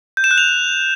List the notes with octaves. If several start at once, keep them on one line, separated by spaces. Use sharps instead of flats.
G6
E7
F#6
F7